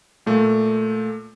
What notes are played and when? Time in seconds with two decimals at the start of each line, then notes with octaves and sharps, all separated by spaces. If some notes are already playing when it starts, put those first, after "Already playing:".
0.26 A#2 A3